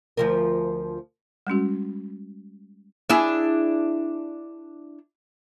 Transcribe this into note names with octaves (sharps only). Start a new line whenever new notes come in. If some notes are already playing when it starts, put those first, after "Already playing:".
D2 F3 A#4
G3 G#3 C#4 F#4
D4 E4 G#4